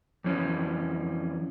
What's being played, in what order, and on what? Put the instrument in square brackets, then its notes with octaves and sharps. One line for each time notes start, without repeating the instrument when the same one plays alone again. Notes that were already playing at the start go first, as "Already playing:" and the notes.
[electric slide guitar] F2 E3 C#4